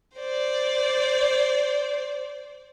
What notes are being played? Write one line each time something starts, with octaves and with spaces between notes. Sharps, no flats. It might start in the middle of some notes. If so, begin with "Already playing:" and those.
C5 D5